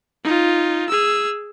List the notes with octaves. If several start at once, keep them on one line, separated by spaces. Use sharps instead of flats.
D#4 F4
G#4 E6